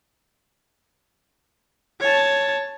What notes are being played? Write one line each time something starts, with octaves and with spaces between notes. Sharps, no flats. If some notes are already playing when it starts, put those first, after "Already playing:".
C#5 A5